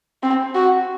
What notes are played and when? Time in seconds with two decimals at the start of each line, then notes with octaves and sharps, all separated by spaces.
0.23 C4
0.55 F#4